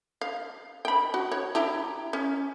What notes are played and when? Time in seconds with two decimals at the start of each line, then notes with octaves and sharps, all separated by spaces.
0.21 F5
0.85 G5 B5
1.14 F#4
1.32 C#5
1.55 E4 G4 A#5
2.13 C#4